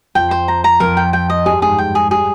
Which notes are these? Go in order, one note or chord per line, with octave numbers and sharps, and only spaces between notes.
F2 F3 G5
C5
A#5
A#5
F2 F3 A#4
G5
G5
D#5
G2 G3 G#4
G#2 G#3 G#4
G5
G#4
G3 G#4